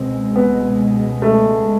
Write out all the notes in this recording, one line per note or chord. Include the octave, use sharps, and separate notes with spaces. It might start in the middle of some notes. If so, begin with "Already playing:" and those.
Already playing: C#2 B2 G#3 C4
B3
A3